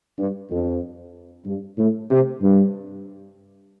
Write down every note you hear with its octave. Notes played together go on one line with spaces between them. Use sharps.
G2
F2
G2
A2
C3
G2